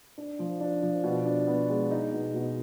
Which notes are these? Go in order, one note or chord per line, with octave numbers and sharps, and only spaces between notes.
D4
F3
D4
F3
B2
D4
B3
G#3
D#4
B2
B2